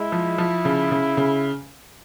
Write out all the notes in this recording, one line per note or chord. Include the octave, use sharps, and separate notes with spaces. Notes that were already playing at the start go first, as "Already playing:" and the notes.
Already playing: G#3 E4
F3
F3
C#3
C#3
C#3